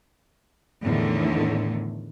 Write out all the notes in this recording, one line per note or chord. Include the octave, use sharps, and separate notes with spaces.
E2 A2 D3 D#3